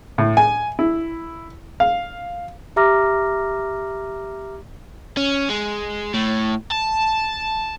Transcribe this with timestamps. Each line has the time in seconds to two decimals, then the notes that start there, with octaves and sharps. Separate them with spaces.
0.18 A2
0.37 G#5
0.79 E4
1.80 F5
2.76 G4 E5 A#5 D6 F6 A#6
5.17 C#4
5.50 G#3
6.14 A2
6.71 A5